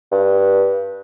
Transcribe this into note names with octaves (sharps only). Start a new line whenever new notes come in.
G2